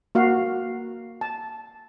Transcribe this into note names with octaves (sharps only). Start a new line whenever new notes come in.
A#3 F#4 F5
A5